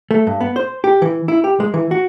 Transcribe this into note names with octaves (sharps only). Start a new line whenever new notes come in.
A3
G2
B3
C5
G4
E3
E4
G4
G#3
E3
F#4